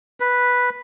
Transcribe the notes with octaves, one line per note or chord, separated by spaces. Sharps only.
B4